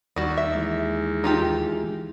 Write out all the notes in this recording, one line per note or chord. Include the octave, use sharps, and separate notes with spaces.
D#2 G3 F#4
E5
E3 G#3
D#4 F4 G4